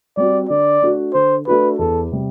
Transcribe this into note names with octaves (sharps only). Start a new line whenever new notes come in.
G3 C4 F#4 D5
D3 D5
A3 D4 F#4
D3 C5
A3 D4 F#4 B4
E2 A4
C3 G3